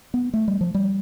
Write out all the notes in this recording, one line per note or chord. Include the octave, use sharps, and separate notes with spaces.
B3
A3
G3
F3
G3